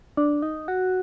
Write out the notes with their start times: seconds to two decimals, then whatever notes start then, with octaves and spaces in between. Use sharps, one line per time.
0.17 D4
0.42 D#4
0.68 F#4